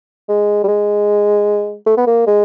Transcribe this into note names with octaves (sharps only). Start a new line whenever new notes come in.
G#3
G3
G#3
A3
B3
A#3
G#3